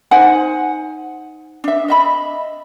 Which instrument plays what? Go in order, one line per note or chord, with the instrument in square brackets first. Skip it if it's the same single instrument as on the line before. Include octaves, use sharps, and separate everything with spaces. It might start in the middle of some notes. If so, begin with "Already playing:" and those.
[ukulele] D#4 C5 F#5 G#5
D4 E5
D#5 E5 B5